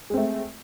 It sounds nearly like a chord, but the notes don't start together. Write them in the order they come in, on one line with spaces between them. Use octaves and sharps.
G#3 C4 A3